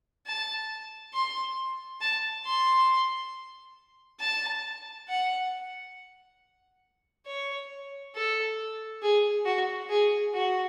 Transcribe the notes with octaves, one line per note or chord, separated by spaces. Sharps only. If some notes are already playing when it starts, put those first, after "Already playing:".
A5
C6
A5
C6
A5
F#5
C#5
A4
G#4
F#4
G#4
F#4